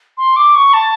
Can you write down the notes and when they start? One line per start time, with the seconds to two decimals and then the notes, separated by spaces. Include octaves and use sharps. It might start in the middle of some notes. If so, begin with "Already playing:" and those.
0.18 C6
0.36 D6
0.55 C#6
0.73 A5